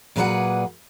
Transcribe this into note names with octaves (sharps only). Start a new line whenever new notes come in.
A#2 F#3 G#4 B4 D5 F#5